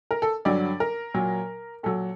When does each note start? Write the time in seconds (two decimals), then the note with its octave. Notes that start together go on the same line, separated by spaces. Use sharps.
0.11 A#4
0.22 A4
0.45 G2 D3 F#3 D5
0.80 A#4
1.14 A#2 F#3
1.83 A#2 F#3 A4